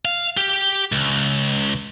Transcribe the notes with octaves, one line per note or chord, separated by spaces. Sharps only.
F5
G4
C#2